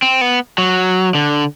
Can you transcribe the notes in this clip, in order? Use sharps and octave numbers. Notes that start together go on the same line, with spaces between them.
C4
B3
F#3
D3